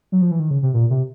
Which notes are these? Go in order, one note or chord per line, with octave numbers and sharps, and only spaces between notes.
F#3
F3
E3
D#3
C#3
C3
A#2
C3